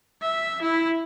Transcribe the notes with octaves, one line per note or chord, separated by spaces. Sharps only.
E5
E4